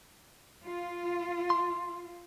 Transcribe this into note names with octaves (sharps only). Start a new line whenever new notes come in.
F4
C6